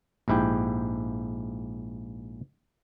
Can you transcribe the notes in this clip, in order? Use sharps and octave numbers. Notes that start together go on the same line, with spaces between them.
A#1 G#2 E4 G4 G5